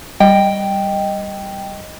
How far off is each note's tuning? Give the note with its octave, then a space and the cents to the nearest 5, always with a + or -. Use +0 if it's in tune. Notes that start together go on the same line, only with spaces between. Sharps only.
G3 +0 D#5 +0 G5 +0